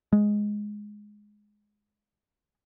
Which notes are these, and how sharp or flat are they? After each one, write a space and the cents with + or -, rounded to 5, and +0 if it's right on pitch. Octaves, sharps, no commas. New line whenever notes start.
G#3 +5